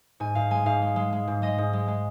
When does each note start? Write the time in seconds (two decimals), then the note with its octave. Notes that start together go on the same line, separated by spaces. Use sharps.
0.20 G#2 G#5
0.35 G#2 F5
0.51 G#3 G#5
0.66 G#2 F5
0.82 G#3
0.96 G#3
1.13 G#3
1.27 G#2
1.42 G#3 D#5
1.58 G#2
1.73 G#3
1.88 G#3